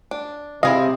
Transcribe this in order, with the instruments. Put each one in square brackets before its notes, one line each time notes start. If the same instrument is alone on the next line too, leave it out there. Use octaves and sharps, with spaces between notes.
[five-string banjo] D4
[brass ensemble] C3 [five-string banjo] E4 G#4 F5 [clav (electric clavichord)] D#5